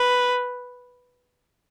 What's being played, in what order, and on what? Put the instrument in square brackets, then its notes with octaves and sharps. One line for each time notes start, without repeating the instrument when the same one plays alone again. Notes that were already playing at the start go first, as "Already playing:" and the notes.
Already playing: [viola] B4